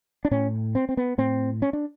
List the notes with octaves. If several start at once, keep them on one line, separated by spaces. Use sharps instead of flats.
D4
A2 C#4
C4
C4
B3
A2 C4
C#4
D4